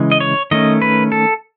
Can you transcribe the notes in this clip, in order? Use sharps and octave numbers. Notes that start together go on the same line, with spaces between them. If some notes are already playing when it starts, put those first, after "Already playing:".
Already playing: C#3 E3 G#3
D#5
C#5
D#3 A3 C#4 D#5
B4
A4